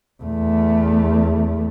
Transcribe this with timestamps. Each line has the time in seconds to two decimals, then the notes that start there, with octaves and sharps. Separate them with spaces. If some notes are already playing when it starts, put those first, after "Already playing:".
0.22 E2 A3